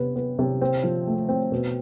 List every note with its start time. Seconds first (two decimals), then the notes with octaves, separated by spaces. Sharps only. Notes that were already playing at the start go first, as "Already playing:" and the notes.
Already playing: C3 B3
0.16 B3
0.39 C3
0.62 C4
0.84 F3
1.07 A3
1.29 C4
1.52 B2